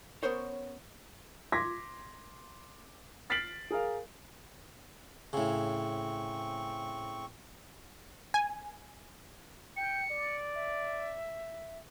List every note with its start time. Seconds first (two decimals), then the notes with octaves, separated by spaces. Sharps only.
0.23 B3 C#4 A#4 C5 C#5
1.52 C6 D6 G#6 A#6 B6
3.30 F6 A6 B6 C7 D7 F#7
3.71 G#4 A#4 F5
5.33 A2 C#3 C4 C#6
8.34 G#5
9.77 G5 C#7
10.10 D5
10.55 E5